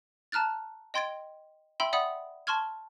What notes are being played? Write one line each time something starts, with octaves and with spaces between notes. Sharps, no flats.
A5 A#5 F6 F#6 A6
D#5 G5 C6 G#6 A6 D7
E5 G5 B5 C6 E6
D5 E5 F#5 B5 D#6
A5 C6 C#6 F6 G#6